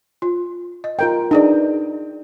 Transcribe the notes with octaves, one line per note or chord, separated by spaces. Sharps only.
F4
D#5
F4 A#4 G5
D4 D#4 G#4 B4 D5